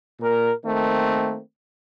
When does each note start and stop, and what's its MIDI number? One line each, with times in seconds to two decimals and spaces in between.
0.19 0.51 46
0.19 0.51 70
0.65 1.40 51
0.65 1.40 57
0.65 1.40 58
0.65 1.40 60